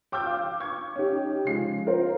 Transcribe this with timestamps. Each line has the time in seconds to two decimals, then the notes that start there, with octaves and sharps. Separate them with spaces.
0.12 G5 D6 E6 F6 G6
0.26 F5
0.60 C#6 G#6
0.96 C#4 D#4 G4
1.45 C#3 F3 G#3 C7
1.86 F4 A#4 C5